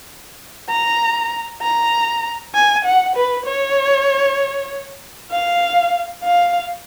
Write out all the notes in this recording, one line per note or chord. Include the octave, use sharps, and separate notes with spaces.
A#5
A#5
G#5
F#5
B4
C#5
F5
F5